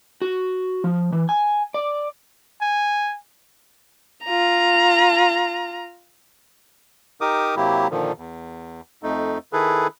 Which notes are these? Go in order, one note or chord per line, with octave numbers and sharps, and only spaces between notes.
F#4
F3
E3
G#5
D5
G#5
F4 A#5
D#4 G4 A#4 D6 D#6
C3 F#3 A#3 E4 G4
A#2 D3 D#3 F3
E2
F2 A3 D#4
D#3 E4 G#4 A4 B4